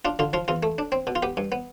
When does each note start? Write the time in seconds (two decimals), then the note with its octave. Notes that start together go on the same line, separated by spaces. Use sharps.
0.05 D4 F4
0.19 D3 F4
0.33 F3 F4
0.48 E2 F4
0.63 A3
0.78 D4
0.92 C4
1.07 B2
1.15 F4
1.23 B3 G4
1.37 G2
1.52 B3